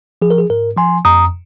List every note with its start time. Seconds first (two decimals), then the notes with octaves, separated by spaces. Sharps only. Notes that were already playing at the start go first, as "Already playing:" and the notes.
0.22 F3 G#4
0.30 A#4
0.38 G#4
0.50 G#2 A#4
0.77 F3 G#5 C6
1.05 F2 A#5 D#6